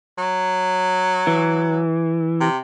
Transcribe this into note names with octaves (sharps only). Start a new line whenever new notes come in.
F#3
E3
C3